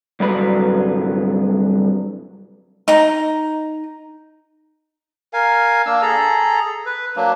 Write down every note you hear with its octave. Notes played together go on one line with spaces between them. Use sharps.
C2 G2 D3 F#3 B4 B5
D#4 A#5
A#4 F5 G#5
A#3 D4 E6
G#4 A4 A#5
B4
F#3 A#3 D4